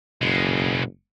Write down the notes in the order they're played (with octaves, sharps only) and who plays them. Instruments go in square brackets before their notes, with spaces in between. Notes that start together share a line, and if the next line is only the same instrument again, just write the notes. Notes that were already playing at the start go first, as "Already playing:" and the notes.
[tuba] F#1 [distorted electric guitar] B2 G#3